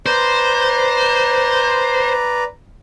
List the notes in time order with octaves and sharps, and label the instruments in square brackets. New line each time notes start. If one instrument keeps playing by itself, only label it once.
[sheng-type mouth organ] B4 D5 A#5 [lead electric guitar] C5